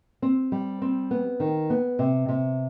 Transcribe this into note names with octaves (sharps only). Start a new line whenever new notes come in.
C4
G3
C4
B3
D#3
B3
C3
C3